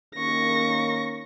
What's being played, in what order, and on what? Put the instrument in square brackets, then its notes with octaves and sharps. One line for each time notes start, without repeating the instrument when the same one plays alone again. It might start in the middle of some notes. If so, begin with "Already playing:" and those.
[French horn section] D#3 A#3 C#4 [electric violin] C#6 A#6